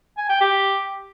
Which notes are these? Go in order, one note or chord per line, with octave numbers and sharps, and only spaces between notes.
G#5
G5
G4